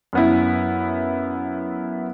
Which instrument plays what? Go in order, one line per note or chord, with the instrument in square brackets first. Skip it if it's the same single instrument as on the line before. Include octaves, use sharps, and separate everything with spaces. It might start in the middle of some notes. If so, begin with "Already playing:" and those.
[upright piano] F#2 B3 E4